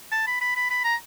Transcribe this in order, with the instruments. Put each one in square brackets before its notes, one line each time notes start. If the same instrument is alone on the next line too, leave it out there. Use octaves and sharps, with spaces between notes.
[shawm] A5
B5
B5
B5
B5
A#5